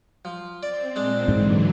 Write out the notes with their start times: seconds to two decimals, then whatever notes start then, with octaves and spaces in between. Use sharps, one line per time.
0.25 F3
0.63 C4 D5
0.96 A#2 G#3 C4 D4
1.28 G#2 D3 E3 F#3